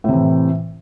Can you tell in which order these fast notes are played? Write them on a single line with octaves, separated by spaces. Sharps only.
A2 C3 E3